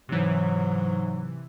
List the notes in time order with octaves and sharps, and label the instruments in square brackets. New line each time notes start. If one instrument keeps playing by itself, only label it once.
[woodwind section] G#2 F#3 [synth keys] C3 E3